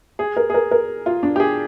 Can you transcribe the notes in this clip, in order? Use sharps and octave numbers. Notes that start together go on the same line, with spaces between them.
G#4
A#4
G#4
A#4
A#4
F4
D4
G4
G#4